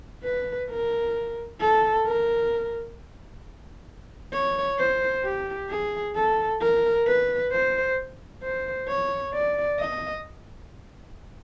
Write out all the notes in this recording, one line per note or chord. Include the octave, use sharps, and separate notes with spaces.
B4
A#4
A4
A#4
C#5
C5
G4
G#4
A4
A#4
B4
C5
C5
C#5
D5
D#5